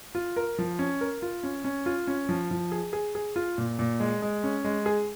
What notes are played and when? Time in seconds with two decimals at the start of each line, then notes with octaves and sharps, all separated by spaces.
0.15 F4
0.36 A#4
0.58 F3
0.79 C#4
1.01 A#4
1.22 F4
1.43 C#4
1.65 C#4
1.86 F4
2.07 C#4
2.29 F3
2.51 F3
2.72 G#4
2.93 G#4
3.15 G#4
3.36 F4
3.58 A#2
3.79 A#2
4.00 G#3
4.22 G#3
4.44 C#4
4.64 G#3
4.86 G#4